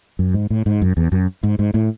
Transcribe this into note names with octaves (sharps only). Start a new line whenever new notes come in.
F#2
G#2
A2
G#2
F#2
E2
F#2
G#2
G#2
A2